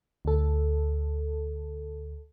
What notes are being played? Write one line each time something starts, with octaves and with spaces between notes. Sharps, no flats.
D2 A4